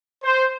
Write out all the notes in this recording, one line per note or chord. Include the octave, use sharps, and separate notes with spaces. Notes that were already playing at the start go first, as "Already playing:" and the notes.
C5